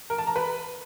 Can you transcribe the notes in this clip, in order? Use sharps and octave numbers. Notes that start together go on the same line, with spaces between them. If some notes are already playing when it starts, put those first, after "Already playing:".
A#4
A5
A#5
B4